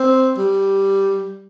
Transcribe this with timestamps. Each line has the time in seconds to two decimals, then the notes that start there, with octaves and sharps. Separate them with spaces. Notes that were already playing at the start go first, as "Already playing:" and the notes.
Already playing: C4
0.37 G3